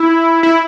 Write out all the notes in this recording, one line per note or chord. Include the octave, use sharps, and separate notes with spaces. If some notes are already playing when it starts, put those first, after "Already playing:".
Already playing: E4
E4